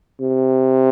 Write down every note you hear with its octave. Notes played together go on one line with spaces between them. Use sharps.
C3